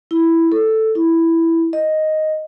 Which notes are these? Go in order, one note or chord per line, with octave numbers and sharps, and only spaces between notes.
E4
A4
E4
D#5